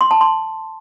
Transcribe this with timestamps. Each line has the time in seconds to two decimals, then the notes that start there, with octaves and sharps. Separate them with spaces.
0.01 C6
0.11 A5
0.21 C6